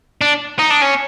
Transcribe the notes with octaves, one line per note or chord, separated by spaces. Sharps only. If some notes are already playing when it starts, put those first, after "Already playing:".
D4
D#4
D4
C#4